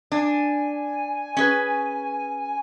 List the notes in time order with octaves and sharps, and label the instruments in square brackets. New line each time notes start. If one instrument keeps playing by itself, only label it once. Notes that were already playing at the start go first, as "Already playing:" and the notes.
[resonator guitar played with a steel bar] D4 [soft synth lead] G#5
[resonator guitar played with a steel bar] C#4 G#4 B4